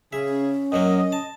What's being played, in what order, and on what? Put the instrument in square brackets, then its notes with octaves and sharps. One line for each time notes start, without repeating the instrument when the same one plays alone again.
[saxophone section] C#3 G#4 [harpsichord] E5
[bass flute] C#4
[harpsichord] F#2 F#3 A#3 [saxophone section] D#5
[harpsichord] A5